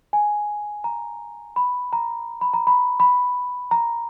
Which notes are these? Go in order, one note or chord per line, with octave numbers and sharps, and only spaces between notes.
G#5
A#5
B5
A#5
B5
A#5
B5
B5
A#5